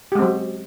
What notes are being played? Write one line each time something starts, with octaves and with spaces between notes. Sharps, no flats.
F#3 G#3 C4 G4